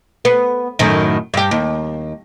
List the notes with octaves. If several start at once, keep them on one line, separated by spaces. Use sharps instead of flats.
B3
F#2 A2 D#3
G2 G4
D#2